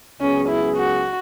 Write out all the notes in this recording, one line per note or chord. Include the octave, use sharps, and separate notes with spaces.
C#2 C#3 F#3 B3 C#4 G#4
E4
F#4